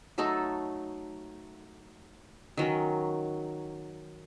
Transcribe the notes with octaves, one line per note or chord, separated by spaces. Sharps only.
F#3 A3 D#4 A4
D#3 F#3 C#4